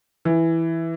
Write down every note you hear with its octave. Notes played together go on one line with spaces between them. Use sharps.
E3